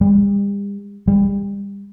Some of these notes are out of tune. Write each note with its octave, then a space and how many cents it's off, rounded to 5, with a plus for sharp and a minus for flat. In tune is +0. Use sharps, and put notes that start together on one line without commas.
G3 +40
G3 +30